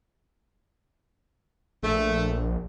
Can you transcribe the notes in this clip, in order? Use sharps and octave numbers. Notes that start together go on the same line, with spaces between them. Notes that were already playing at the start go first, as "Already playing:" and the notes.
A#1 A3